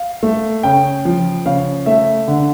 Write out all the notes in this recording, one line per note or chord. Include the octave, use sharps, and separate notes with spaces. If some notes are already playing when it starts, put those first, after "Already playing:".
Already playing: F5
A3
C#3 G5
F3
C#3 F5
A3 E5
D3